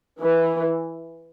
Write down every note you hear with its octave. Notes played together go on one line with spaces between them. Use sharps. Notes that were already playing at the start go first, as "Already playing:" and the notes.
E3